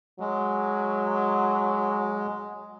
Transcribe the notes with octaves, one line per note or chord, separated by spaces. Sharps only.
F#3 G#3